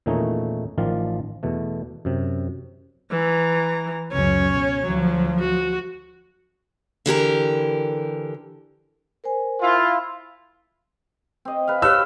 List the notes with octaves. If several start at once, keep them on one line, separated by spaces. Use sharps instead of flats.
E2 A#2 D#3 A3 C#4 D#4
A1 D#3 F3 F4 D5 F5
E2 B2 A3
F#2 C3
E3 A#5
C#2 F#2 C#4 C#5
B2
D2 F3 F#3
F#4
D3 E3 G4 A#4
A#4 C5 G#5
E4 F4
C4 D#5
B4 F5
G4 B4 C#5 E6 F6